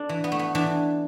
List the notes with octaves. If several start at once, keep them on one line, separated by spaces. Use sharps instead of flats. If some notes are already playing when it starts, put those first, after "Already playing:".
Already playing: D4 A4
E3
B3
A3
B3
E3 D4